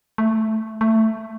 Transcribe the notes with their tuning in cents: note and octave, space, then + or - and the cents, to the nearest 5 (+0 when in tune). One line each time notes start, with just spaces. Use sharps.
A3 +0
A3 +10